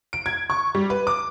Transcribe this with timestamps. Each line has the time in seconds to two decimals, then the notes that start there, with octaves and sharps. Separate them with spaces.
0.13 D7
0.26 G#6
0.50 C#6
0.75 G3
0.90 B4
1.07 D6